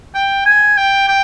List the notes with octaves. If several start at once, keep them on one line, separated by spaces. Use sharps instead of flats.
G5
G#5
G5
G5